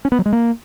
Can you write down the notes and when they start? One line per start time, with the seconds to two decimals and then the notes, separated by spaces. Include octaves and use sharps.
0.05 C#4
0.12 B3
0.19 F#3
0.26 G#3
0.33 A#3